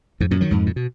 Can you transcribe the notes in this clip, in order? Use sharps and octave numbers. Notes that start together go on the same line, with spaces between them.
F2 G#2
F#2 A#2
D#3 F#3
F2 G#2
A#2
B2